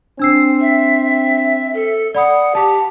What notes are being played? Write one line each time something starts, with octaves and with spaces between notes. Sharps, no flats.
C4 D4 E6 C7
E5
A4
D5 F#5 B5 D#6
G4 A5